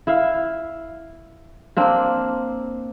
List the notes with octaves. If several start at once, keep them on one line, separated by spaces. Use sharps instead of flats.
E4 E5 F5
A#3 C4 D4